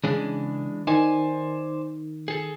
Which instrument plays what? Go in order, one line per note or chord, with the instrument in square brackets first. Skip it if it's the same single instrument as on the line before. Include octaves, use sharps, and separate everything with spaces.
[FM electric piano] C#3 [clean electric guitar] E3 G#3 D4
[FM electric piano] D#3 [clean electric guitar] C5 D5 G#5
[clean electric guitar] G#4 A4